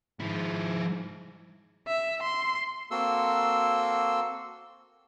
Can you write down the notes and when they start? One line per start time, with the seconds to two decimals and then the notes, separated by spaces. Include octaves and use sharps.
0.20 G#2 F3 E4
1.87 E5
2.22 C6
2.91 A#3 C4 F#4 A4 C6 E6